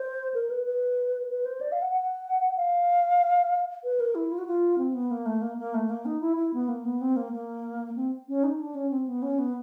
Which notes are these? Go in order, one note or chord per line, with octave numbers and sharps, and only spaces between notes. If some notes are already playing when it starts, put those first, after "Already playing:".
Already playing: C5
A#4
B4
B4
B4
C5
D5
F5
F#5
F#5
F5
B4
A#4
E4
F4
F#4
F4
C4
B3
A#3
A3
A#3
A#3
A3
A#3
D#4
E4
E4
B3
A#3
B3
C4
A#3
A#3
C4
C#4
D#4
D4
C#4
C4
B3
C#4
B3